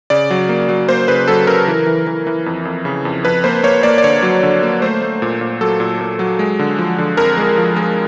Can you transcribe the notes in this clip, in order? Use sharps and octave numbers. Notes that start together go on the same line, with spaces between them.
C#3 D5
F#3
A#3
F#3
A#3 C5
C#3 B4
F#3 A4
C#3 A#4
E3
E3
E3
E3
F2
F2
C#3
F2
F2 B4
A#3 C5
A#3 C#5
A#3 D5
D5
D3 C#5
F#3
D3
A#3
A3 C5
A3
A#2
A#2
F#3 A4
A#2
A#2
F#3
G#3
D3
F3
D3
F2 A#4
G#3
F3
G#3